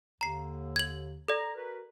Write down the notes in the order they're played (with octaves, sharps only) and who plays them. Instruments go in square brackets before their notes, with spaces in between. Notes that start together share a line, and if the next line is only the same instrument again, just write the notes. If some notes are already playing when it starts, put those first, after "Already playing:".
[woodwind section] D#2 D3 [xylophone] A#5 C7
[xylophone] G#6 F#7
[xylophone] A4 D5 [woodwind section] A#5
[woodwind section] F#4 A#4 B4